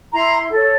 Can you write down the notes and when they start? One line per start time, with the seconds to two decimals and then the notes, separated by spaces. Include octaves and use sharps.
0.13 E4 A#5 C6
0.51 A4 C#5